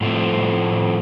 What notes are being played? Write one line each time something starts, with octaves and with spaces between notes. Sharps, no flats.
A2 F3 A3 C4